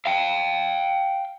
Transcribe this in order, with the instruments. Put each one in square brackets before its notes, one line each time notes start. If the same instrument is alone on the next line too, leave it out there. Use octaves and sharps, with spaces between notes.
[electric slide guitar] F5 G5